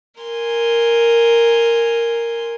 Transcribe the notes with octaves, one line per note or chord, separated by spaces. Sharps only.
A#4 G#5 C6